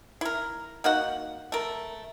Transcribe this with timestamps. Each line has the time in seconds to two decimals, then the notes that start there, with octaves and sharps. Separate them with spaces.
0.21 E4 A#4
0.84 A#3 D#4 F#4 F#5
1.52 A3 A#4